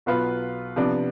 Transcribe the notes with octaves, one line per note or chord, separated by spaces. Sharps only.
B1 B2 B3 F4 B4
C3 F3 B3 D4